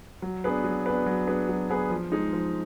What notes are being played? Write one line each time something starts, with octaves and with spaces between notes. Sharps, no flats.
F#3
B3 D4 G#4 B4
F#3
B3 D4 G#4 B4
F#3
B3 D4 G#4 B4
F#3
B3 D4 G#4 B4
F3
G#3 D#4
F3